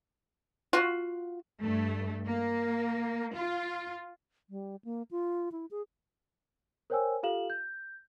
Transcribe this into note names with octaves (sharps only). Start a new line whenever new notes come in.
F4 F#4
G2 A3
A#3
F4
G3
A#3
F4
E4
G#4
A#4 C5 C#5 G5 G#5 E6
F4 G4 A4 F5 E7 F#7
G6